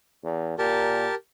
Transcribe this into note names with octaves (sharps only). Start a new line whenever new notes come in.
E2
A#2 G4 A#4 A5